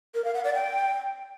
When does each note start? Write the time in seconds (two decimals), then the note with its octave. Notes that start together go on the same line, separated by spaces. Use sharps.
0.14 A#4
0.24 F5
0.34 F#5
0.44 D5
0.54 G5